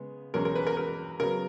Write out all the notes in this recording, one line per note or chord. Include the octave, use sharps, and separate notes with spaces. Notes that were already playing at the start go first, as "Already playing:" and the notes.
Already playing: C#3 G#3 B3
E2 B2 G#3 C#4 A#4
A#4
B4
A#4
A#4
C#3 F#3 B3 A#4